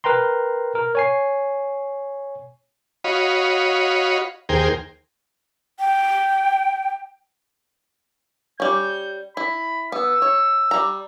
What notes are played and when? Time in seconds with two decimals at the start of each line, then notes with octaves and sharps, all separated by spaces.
0.04 A#4 B4 G5 A#5 C6
0.75 A#4
0.95 C#5 G#5 C7
3.04 F#4 C#5 D#5 F5 B5
4.49 D#2 G#4 A#4 C5 G5
5.79 G5
8.60 G3 C#4 G6
9.37 E4 B5
9.92 B3 E6
10.22 C#5
10.71 G3 A#5